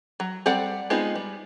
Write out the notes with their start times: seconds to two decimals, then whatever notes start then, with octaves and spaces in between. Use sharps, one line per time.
0.20 F#3
0.46 G3 C4 A4 D5 F#5
0.90 G#3 B3 C4 D#4 F4
1.15 G3